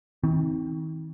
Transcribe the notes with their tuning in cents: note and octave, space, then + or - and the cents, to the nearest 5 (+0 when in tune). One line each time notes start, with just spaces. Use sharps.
D#3 +40 C4 +0